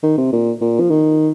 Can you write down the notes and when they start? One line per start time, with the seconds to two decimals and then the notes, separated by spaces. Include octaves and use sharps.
0.03 D#3
0.17 C3
0.32 A#2
0.61 A#2
0.80 F3
0.90 D#3